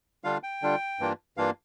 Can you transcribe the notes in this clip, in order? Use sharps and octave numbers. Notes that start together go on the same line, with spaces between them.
D3 G3 D4 F4 F5
G5
D3 G3 D4 F4
G2 E3 A#3 D4 F4
G2 E3 A#3 D4 F4 F5